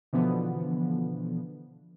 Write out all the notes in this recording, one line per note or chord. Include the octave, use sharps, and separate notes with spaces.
B2 D3 E3 F3 B3